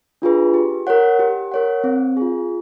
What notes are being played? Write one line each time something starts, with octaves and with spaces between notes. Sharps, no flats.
D4 F4 G#4 B4
G4
A#4 C#5 F#5
G4
A#4 C#5 F#5
C4
F4 G#4